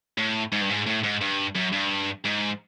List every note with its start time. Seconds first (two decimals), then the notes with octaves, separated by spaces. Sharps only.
0.18 A2
0.52 G#2
0.61 G2
0.70 G#2
0.87 A2
1.04 G#2
1.21 G2
1.56 F#2
1.73 G2
2.25 G#2